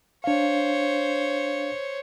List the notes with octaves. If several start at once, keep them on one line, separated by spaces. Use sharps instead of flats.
D4 C5 C#5 F5